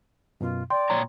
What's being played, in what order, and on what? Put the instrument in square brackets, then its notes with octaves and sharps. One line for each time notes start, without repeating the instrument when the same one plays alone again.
[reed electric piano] F#2 B2 [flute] F4
[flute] D5 [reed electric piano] G5 [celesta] C6
[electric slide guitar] A#2 C#5 A#5